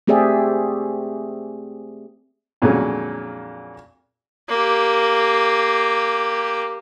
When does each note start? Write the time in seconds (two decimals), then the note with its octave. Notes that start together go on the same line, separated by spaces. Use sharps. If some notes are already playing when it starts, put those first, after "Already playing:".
0.07 A3 C4 G4 G#4 D5 E5
2.62 F2 A#2 D3 F#3 G#3 C#4
4.49 A#3 G4